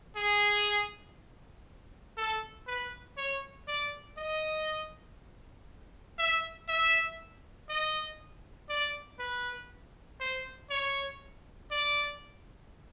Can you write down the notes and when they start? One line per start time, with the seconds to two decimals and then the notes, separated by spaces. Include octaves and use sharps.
0.16 G#4
2.17 A4
2.67 B4
3.17 C#5
3.68 D5
4.18 D#5
6.19 E5
6.68 E5
7.69 D#5
8.69 D5
9.19 B4
10.20 C5
10.70 C#5
11.71 D5